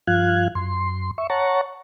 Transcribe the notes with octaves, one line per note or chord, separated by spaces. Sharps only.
G2 F3 F4 F5 F#6 G#6
F#2 C6
E5 C#6
C#5 F#5 A5 A#5 C#6